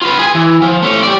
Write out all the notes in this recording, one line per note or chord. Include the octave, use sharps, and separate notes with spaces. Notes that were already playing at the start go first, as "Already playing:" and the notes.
F4 B4
G#4 G#5
E3
F3
A3 C#4
G4 D5